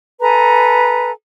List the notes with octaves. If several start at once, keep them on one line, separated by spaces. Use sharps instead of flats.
A4 B4 G#5 A#5